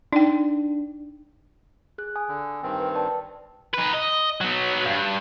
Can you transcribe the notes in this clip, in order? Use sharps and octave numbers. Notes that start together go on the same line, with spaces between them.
D4 D#4 G5
G#4 F#6
G#5 D#6
D3
G2 D#3 C4
B4
D5 G5 A5
D#4 B4
D#5
F#3 B3
G2